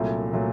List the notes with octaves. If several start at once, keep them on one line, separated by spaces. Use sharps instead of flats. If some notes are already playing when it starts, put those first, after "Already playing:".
Already playing: C2 A#2 F#3 A3
A#2 F#3 A3